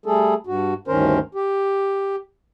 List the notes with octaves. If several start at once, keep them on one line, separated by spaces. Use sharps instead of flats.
G3 A3 G#4 A4
G2 F#4
D2 G2 D#3 C#4 A#4 C5
G4